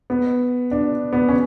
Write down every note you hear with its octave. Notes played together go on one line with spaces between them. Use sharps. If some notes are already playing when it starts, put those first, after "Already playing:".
B3
D4
B3
C#4